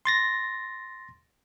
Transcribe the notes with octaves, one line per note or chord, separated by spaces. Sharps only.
C6 A6 A#6